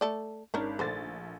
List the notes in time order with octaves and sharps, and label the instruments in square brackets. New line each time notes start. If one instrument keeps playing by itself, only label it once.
[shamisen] A3 A4 D5
[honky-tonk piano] G#1 [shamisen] C#4 D4 A#4
[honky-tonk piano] A#1 A3 A6 [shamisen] D3 C5